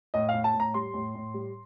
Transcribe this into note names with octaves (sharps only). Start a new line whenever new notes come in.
A2 D#5
F5
A2
A5
A2
A#5
G3 C6
A2
A2
G3